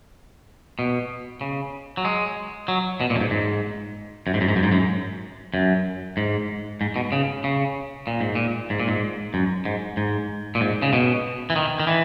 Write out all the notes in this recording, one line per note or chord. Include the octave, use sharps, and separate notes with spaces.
B2
C#3
F#3
G#3
F#3
B2
A#2
F#2
G#2
G#2
F#2
G#2
F#2
G#2
F#2
G#2
F#2
F#2
G#2
G#2
B2
C#3
C#3
A#2
G#2
A#2
G#2
A#2
G#2
F#2
G#2
G#2
A#2
G#2
C#3
B2
E3
D#3
D#3
E3